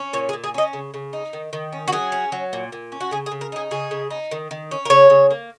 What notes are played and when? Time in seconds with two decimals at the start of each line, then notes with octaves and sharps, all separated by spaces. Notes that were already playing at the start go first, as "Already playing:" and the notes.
Already playing: C#4
0.13 A#2 C#5
0.29 G#4
0.33 A#2
0.44 G#4
0.54 C#4 D#5
0.73 C#3
0.94 C#3
1.13 D#4
1.33 D#3
1.53 D#3
1.72 C#4
1.88 F#4
1.92 F#3 G#4
2.12 C#4
2.32 F#3
2.53 A#2
2.72 A#2
2.92 C#4
3.00 F#4
3.11 C#3 G#4
3.26 G#4
3.32 C#3
3.41 A#4
3.52 D#4 G#4
3.71 C#3 G#4
3.91 C#3
4.11 D#4
4.31 D#3
4.51 D#3
4.71 C#4
4.85 A#4
4.90 C#3 C#5
5.10 C#3
5.31 A#3